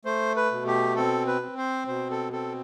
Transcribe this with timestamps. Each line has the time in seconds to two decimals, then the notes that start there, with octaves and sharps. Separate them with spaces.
0.05 A3 C5
0.36 B4
0.51 B2
0.67 G4
0.96 C4 A4
1.27 B4
1.42 C4
1.57 C5
1.88 B2 C5
2.11 A4
2.32 C4 A4